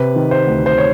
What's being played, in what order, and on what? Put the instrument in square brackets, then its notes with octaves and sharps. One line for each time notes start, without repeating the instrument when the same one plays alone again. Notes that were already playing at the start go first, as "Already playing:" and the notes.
Already playing: [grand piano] C3 B4
D#3
C5
D2
C5
C#5